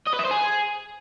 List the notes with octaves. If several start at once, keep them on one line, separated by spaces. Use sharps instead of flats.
D#5
B4
E5
C5
G#4